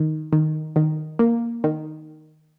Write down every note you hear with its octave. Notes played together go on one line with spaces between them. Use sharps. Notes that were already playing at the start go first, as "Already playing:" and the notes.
Already playing: D#3
D#3
D#3
A#3
D#3